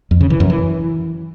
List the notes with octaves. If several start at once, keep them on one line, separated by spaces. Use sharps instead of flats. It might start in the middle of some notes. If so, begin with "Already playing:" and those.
F2
C#3
E3
F#2
E3